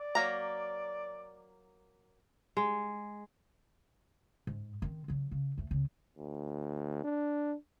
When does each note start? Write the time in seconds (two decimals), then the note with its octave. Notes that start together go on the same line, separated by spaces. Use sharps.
0.01 D5
0.15 F#3 A#3 A#5
2.57 G#3
4.47 G#2
4.82 D#3 C4
5.08 C#3 F#3
5.32 C#3
5.58 D#2 A3
5.71 C#2 C#3
6.18 D2
7.04 D4